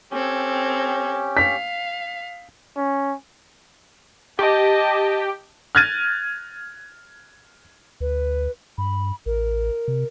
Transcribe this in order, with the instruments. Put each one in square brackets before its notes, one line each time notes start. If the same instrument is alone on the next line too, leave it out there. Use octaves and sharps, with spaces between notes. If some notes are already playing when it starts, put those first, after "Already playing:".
[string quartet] C4 A4 G#6 [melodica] C#4 G4
[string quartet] F5 [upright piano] B6
[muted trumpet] C#4
[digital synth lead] G4 [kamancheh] D#5 A5
[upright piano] F6 F#6 G#6 A6 D#7
[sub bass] D2 [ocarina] B4
[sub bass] G2 [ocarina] B5
[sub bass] A1 [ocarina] A#4
[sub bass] C3